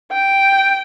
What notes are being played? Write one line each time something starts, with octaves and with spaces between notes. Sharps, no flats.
G5